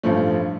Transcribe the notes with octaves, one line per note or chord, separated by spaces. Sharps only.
A1 G2 F3 A3